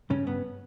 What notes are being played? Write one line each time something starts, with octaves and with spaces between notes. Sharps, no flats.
G2 C#3 C#4
G2 B3